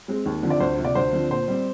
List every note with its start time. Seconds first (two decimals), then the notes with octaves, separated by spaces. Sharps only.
0.08 G#3 C4
0.26 D#2
0.43 D3 F3 C4
0.50 D5
0.60 D2 C5
0.78 C3 F3
0.85 D5
0.95 D2 C5
1.13 D3 F3 C4
1.30 A#2 C5
1.48 G3 C4